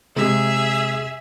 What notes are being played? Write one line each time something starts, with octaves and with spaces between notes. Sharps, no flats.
C3 G#3 G#4 E5